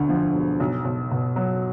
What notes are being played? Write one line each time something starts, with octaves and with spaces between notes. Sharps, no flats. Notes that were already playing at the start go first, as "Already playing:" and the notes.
Already playing: E1 D2 D3
F3
E1
B1
B1
B2
F#3